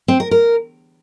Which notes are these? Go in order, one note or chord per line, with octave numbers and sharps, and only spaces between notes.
C4
A#4
A#4